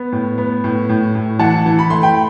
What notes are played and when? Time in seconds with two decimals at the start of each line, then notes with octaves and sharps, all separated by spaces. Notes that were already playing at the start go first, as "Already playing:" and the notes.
Already playing: B3
0.12 A2
0.38 B3
0.64 A2
0.89 A2
1.15 A2
1.39 E3 F#5 A5
1.66 E3
1.79 B5
1.90 A3 C6
2.03 G5 B5